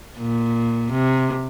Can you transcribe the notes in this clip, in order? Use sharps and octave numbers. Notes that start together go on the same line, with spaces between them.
A#2
C3